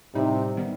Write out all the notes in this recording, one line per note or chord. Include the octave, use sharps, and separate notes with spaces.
A2 C3 G3 D#4
D#3 G3 B3